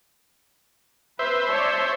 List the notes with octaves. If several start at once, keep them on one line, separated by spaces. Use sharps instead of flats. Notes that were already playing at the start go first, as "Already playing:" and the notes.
B4 C5 E5
C#5 D5 A5